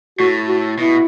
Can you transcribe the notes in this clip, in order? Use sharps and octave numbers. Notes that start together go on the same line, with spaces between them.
A2 F#4
F#4
B2 E4